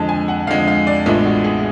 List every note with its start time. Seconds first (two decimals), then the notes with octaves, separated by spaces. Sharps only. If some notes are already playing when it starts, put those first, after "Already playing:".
Already playing: F2 D3 G#3 A5
0.09 G#5
0.28 F#5
0.47 F2 D3 G#3 F5
0.68 F5
0.87 D5
1.06 A1 A2 G#3 B3 D4 F4
1.26 F#4
1.44 G#4